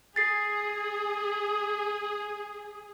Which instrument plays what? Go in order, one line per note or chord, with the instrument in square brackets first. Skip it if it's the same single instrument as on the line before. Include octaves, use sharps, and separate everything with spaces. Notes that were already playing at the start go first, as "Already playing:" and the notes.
[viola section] G#4 [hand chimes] A6 C7